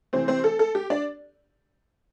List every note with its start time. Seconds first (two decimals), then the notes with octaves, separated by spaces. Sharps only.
0.13 C3 E3 A3 C4 C5
0.28 C4 C5
0.44 A4
0.59 A4
0.75 G4
0.90 D4 D5